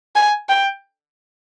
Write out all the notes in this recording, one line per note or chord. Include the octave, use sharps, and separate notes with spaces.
G#5
G5